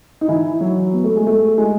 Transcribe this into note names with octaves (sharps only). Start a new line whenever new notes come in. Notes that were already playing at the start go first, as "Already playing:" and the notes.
D#4
E3 E4
F#3 F#4
B3
A3
G#3
A3
G#3